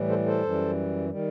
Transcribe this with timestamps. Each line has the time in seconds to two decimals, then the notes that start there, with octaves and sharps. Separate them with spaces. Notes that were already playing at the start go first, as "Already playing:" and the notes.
Already playing: A2 E3 G3
0.09 A4 C5
0.26 A4 C5
0.43 F#2 E3 G3
1.09 D#3 G3